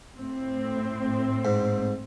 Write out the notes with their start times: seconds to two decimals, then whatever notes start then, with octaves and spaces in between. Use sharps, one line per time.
0.18 A2 C4
1.45 G#2